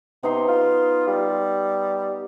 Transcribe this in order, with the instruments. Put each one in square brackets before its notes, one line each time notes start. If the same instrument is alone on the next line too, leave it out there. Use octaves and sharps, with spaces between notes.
[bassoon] C3 [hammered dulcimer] B3 D#4 C6
[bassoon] F4
G3